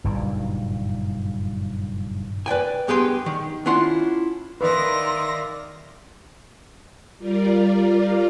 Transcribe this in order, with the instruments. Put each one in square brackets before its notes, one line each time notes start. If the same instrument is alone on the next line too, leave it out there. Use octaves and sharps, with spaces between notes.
[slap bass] F#1 G2 A#2 D#3
[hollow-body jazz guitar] B4 D5 G5 G#5
G2 B3 G4 G#4 G5 C6
D#3
C#4 D4 E4 F4 F#5
[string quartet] D#3 A#6 [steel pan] B4 [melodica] D5 E5 F5 [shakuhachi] C6
[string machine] G3 F4 A#4 D5